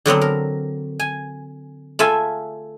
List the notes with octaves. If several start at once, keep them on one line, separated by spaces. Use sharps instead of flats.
D3 F#3 B3 C4
A#4
G#5
A3 F4 E5 G#5